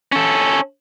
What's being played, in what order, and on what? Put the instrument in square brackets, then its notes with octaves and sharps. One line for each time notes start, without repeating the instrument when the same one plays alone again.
[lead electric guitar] C#4 A4